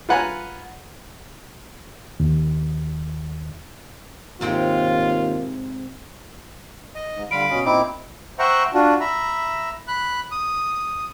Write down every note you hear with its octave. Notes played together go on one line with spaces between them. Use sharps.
F4 B4 F#5 G#5 A#5
D#2
D#2 G#2 C3 F4 G5
D#5
G#2
D3 G3 F4 F5 B5 D7
B2 C#4 D#5
A#2 C4 D#4 E4 D#5 B5 D6
C5 E5 F#5 G5 A#5 C#6
D4 F4 F#4
E5 A#5 B5
B5 F#6
D#6